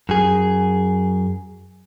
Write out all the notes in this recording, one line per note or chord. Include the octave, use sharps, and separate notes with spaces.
F#2 G#4